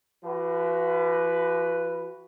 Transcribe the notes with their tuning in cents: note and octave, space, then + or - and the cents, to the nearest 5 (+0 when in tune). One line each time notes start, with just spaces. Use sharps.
F3 -40 F#4 +20 B4 +0